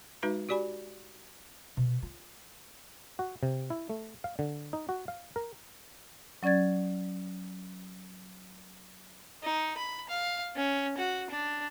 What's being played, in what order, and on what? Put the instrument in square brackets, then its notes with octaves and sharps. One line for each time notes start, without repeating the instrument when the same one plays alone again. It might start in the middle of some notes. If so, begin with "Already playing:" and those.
[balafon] G#3 D#4 F#4 B4 E5 A#5
F#4 G4 D5 G#5 B5
[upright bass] B2
F4
[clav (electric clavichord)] F#4
C3
E4
A3
F5
D3
D#4
F#4
F5
A#4
[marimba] F#3 C#4 D5 G#6 A6
[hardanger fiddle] D#4
B5
F5
C#4
F#4
D4